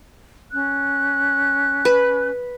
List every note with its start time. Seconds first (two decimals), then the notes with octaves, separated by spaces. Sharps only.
0.52 C#4 F#6
1.85 B4